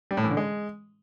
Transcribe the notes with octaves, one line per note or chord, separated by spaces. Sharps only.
G3
A2
E3
D3
G#3